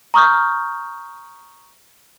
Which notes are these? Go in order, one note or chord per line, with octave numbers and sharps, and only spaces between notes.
A#5 C#6 D#6 F6 G6